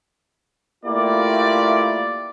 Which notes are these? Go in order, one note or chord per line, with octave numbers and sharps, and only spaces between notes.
A3 A#3 E4 F4 G4 D5